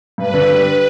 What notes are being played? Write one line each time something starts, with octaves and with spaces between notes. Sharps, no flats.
G2 B4
D3
G3